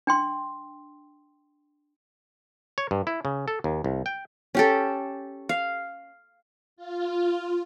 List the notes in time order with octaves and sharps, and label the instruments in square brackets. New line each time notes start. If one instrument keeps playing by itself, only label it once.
[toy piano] D4 G5 C6
[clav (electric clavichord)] C#5
G2
E4
C#3
A4
D#2
C2
G5
[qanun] C#4 G4 A4
F5
[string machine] F4